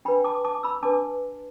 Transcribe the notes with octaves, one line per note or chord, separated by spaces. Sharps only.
D4 B4 G5 B5
A5 D6
A5 D6
B5 E6
D4 B4 A5 D6